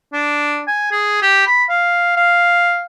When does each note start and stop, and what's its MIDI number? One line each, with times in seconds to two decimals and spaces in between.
0.13 0.62 62
0.68 0.89 80
0.92 1.20 68
1.22 1.44 67
1.47 1.63 83
1.69 2.13 77
2.17 2.84 77